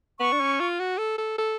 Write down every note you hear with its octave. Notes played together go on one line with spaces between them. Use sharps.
B3 C#6
D4
C#4
F4
F#4
A4
A4
A4